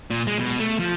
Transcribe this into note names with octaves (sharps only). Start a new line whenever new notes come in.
A#2
G#3
B2
A3
F3